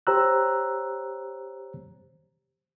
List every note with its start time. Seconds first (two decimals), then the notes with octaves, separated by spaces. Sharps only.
0.07 G4 C5 C#5 A#5 E6 F#6